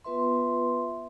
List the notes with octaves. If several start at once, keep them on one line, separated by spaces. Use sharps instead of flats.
B3 F4 B4 E5 C6